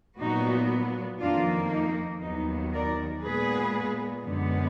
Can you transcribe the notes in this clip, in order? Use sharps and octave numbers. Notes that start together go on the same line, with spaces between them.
A#2 F#3 B3 D#4 F#4
F2 D#3 A#3 D4 F4
D#4
D#2 D#3 F#3 B3 D#4
A#4 D5
A#2 G#3 B3 G#4 B4
F#2 D3 G#3 B3